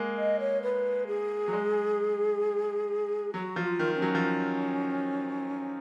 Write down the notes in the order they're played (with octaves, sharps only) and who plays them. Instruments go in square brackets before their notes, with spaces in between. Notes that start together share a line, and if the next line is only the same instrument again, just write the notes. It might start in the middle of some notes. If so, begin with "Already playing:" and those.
Already playing: [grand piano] G#3 A#3
[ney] D#5
C#5
B4
G#4
[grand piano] F#3
G#3
[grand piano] F#3 [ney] F#4
[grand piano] F3
[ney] F#4
F4
[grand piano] D#3
[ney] C#4
[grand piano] F#3
F3